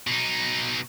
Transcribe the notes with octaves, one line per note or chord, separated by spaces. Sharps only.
B2 D#4